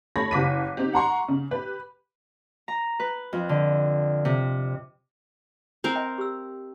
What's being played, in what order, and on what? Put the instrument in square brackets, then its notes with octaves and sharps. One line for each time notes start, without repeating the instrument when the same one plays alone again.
[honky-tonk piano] A3 C#5 B5 A#6
F#1 D6 B6 D#7
C4 D#4 G4
F#5 A#5 C6 C#6
C#3
G4 B4
[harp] A#5
B4
F2
D3
C3
[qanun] C4 A#4 F5
[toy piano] D#5 G5
G4 E6